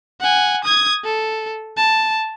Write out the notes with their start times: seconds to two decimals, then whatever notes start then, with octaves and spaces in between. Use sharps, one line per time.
0.20 F#5 G#5
0.64 D#6 G#6
1.05 A4
1.77 A5